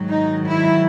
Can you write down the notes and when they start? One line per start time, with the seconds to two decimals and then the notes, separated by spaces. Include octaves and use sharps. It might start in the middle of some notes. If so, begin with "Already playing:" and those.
Already playing: G#2 D#3 F#3
0.09 D#4
0.45 E4